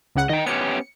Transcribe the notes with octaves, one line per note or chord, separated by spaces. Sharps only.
C#2 C#3 F#5
D#3 D#5 G5
B3 C#4 G4 C#7